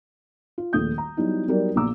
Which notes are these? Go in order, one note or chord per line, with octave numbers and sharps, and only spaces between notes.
F4
D#1 A#1 A3 D#6 G6
A#5
F#3 G3 B3 D#4 E4
F#3 G3 B3 D#4 A#4 D5
A#1 A#2 B3 A#5 D6 E6